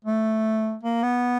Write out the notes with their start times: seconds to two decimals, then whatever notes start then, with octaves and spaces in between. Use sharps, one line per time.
0.04 A3
0.83 A#3
1.03 B3